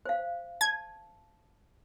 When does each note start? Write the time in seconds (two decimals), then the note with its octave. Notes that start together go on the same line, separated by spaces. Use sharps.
0.06 C5 F5
0.61 A5 G#6